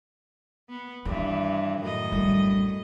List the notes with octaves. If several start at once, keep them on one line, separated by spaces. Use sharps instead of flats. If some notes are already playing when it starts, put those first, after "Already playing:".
B3
G2 D#3 E3
F#2 A2 D#5
A#1 G3